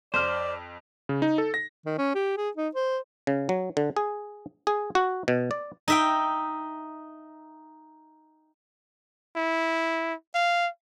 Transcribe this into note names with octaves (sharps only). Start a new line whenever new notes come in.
F2 C5 D5 F6
C#3
D#4
A4
A#6
D#3
C#4
G4
G#4
D#4
C5
C#3
F#3
D3
G#4
G#4
F#4
B2
D5
D#4 E5 G5
E4
F5